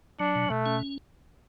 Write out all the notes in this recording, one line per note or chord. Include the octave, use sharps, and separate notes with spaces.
F#3 D4
B2
B2 A3
C#4